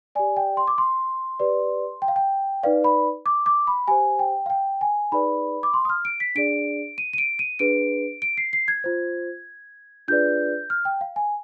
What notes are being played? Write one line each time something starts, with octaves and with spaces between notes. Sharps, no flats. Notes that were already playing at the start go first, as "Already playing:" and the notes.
G4 D5 G#5
G5
C6
D6
C6
G4 B4 D5
G5
F5
G5
D#4 B4 D5 F5
B5
D6
D6
B5
G4 C5 G#5
G5
F5
G5
G#5
D#4 G#4 B4 D5 B5
D6
C6
D#6
F6
D7
B6
D4 G#4 D5 D7
D#7
D#7
D7
D#7
D4 G#4 B4 D7
D7
C7
C7
G#6
F4 C5
D4 F4 G#4 B4 D5 G6
F6
G5
F5
G#5